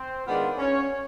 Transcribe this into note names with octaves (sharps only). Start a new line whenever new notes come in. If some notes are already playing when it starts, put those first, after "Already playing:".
Already playing: C4 C5
D#3 G#3 B3 D4 F4
C#4 C#5